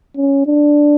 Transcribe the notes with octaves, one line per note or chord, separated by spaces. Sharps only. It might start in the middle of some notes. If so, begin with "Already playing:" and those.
C#4
D4